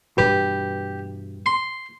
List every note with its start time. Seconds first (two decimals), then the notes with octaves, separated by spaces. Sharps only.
0.18 G2 B2 E3 G4 B4
1.46 C6